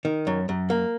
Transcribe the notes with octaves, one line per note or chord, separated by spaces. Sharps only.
D#3
F#2
F#2
A#3